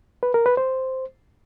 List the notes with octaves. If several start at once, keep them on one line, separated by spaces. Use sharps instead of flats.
B4
A#4
B4
C5